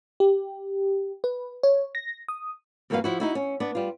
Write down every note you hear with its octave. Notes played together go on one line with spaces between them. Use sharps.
G4
B4
C#5
A#6
D#6
E2 G2 A#3 F#4 B4 F5
F3 E4 F#4
D#4 E4 F#4
C#4
B3 D4
G3 F4